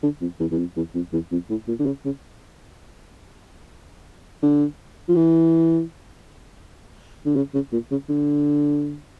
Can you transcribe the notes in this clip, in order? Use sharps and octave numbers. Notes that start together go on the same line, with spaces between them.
D3
F2
E2
E2
F2
E2
F2
E2
F2
A2
A#2
D3
C#3
C#3
D3
F3
E3
D3
C#3
C#3
A#2
C#3
D3